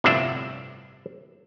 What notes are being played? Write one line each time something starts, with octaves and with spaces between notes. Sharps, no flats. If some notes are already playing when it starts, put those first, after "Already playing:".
G1 A2 C3 F3 D4 E5